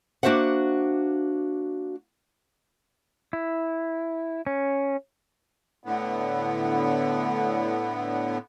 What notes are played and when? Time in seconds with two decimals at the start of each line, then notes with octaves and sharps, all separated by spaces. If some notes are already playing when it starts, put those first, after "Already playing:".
0.23 A#3 D4 F#4 C5 E5 F#5
3.33 E4
4.47 C#4
5.84 A2 D3 B3